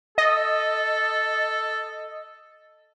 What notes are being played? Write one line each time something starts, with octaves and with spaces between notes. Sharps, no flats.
A4 D#5